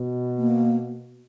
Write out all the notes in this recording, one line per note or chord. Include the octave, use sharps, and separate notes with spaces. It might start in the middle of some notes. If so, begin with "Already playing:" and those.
Already playing: B2
A#3